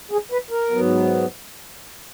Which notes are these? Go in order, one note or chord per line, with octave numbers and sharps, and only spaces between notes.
G#4
B4
A#4
G#2 F#3 B3